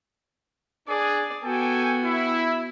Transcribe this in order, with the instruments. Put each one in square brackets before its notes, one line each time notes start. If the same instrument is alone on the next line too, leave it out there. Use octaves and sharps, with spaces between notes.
[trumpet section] D4 G#4 [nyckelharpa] D5
[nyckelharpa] B3 F#4 [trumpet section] A4 G5 G#5
[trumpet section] E4